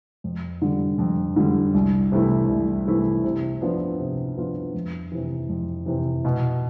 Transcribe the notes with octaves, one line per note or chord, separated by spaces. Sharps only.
F2
D3 G3
F2
D3 G3
C2
C3 E3 A3 E4
C2
C3 E3 A3 E4
C3
F3 B3 D4 F4
C3
F3 B3 D4 F4
F2
C3 E3
F2
C3 E3
B2